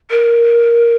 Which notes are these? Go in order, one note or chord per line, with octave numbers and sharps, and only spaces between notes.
A#4